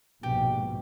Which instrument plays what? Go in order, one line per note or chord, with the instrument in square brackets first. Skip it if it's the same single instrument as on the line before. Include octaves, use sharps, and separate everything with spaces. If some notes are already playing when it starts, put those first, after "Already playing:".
[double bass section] A#1 G#2 B2 [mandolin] G4